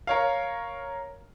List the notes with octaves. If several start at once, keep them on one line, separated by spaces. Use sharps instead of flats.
A#4 C#5 F5